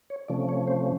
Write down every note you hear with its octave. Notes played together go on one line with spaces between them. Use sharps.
C#5
C3 F3 A3 C#4 D5
C#5
C5